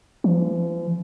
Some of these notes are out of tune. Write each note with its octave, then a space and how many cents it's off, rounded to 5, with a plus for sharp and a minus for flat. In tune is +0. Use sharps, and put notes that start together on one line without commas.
F3 -45